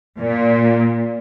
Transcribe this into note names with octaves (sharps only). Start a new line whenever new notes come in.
A#2